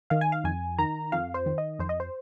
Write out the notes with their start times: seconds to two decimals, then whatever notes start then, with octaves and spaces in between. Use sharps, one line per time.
0.10 D#3 F5
0.21 G#5
0.32 F5
0.44 F2 G#5
0.78 D#3 A#5
1.12 F2 F5
1.34 C5
1.46 D#3
1.58 D#5
1.79 F2 C5
1.89 D#5
2.00 C5